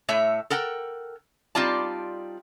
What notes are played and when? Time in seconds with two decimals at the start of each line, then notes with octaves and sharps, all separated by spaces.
0.08 A2 A3 C#5 E5
0.50 A4 A#4 F#5 G5
1.55 G3 C4 D#4 F4 D5 A5